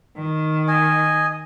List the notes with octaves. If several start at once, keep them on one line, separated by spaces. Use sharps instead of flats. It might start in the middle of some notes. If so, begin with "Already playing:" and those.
D#3
D#5 G#5